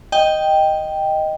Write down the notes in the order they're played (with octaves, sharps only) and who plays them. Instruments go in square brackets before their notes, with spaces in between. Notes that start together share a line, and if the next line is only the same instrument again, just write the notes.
[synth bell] D#5 G5